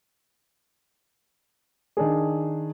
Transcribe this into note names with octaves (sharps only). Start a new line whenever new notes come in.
D#3 D4 G#4